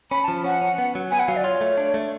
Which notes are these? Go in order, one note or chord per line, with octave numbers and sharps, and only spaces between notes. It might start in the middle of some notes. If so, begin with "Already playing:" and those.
C#4 B5
A5
F3
C#4 F#5
C#4
B3
F#3
B3 G#5
F#5
F#3 F5
D5
F4 C#5
A3
D4
A3